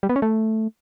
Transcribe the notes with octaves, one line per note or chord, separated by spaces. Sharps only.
G3
B3
C#4
A3